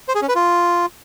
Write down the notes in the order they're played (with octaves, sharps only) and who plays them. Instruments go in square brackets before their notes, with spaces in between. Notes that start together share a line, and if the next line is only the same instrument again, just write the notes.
[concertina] C5
G#4
C#4
B4
F4